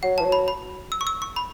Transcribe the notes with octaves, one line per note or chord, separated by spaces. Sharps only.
F#3 F#5
E3 A5
F#3
B5
B5
E6
C#6
E6
C#6
B5